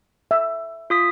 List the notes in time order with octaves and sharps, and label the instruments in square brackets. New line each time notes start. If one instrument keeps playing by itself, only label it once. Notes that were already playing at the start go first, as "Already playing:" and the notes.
[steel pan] E5
[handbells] F4 D#6 B6